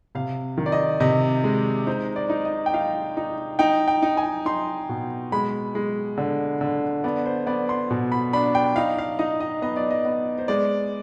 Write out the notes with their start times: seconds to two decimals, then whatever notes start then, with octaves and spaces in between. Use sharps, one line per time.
0.15 C3 F5
0.58 D#3
0.66 D5
0.72 D#5
1.00 C3 D#5
1.44 G#3
1.86 D#4 C5
2.16 D5
2.30 D#4
2.45 D#5
2.66 G5
2.74 D#4 F5
3.17 D#4
3.59 D#4 G5
3.88 G5
4.02 D#4
4.17 G#5
4.46 D#4 C6
4.89 B2
5.32 G#3 B5
5.75 G#3
6.17 D3
6.61 D3
7.04 B3 D5
7.26 C5
7.47 B3 D5
7.69 C6
7.91 B2
8.12 B5
8.33 D4 B5
8.55 G5
8.76 D#4 F5
8.98 F5
9.19 D#4 D#5
9.40 D#5
9.62 B3 D#5
9.77 D5
9.91 D#5
10.05 B3
10.39 C5
10.48 G#3 D5